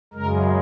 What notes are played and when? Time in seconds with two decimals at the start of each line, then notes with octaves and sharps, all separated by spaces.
0.14 F#2 C#3 G#3 A#4